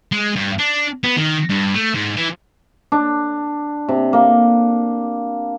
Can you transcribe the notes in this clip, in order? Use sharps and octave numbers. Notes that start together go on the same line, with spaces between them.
G#3
G2
D4
B3
D#3
G2
A3
G#2
E3
D4
C3
A#3